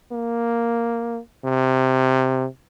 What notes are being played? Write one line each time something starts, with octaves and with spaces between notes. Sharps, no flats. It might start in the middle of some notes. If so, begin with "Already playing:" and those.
A#3
C3